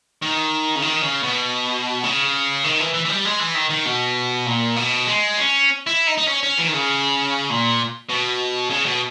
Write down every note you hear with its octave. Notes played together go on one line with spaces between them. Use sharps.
D#3
C#3
D#3
C#3
B2
C#3
D#3
E3
E3
E3
G3
G#3
E3
D#3
D#3
B2
A#2
B2
G#3
C#4
E4
D#4
D#4
C#4
C#4
E3
D#3
C#3
A#2
B2
C#3
B2